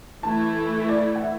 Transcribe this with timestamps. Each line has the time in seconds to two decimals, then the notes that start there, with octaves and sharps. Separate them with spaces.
0.23 E3 A3 E4 A4 A5
0.89 D5
1.15 F#5
1.22 E5